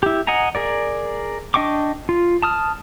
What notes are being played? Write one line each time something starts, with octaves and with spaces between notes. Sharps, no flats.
E4 G4
D#5 F#5 G#5 A#5
G#4 A#4 D5
D4 D#5 G5 C#6 D6
F4
A5 D#6 F6